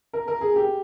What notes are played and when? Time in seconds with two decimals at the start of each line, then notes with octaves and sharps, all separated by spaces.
0.13 A#4
0.28 A#4
0.41 G#4
0.56 G4